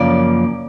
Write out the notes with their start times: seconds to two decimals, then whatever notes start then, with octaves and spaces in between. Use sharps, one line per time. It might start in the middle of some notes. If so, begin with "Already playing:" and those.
Already playing: F#2 C#3 F3 A#3 D5